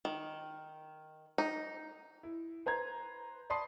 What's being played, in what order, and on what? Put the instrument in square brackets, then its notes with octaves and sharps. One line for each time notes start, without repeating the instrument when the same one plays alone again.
[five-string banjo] D#3
D#4
[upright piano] E4
B4 C5 A#5 G#6
D5 A5 B5 C6 D#6 C7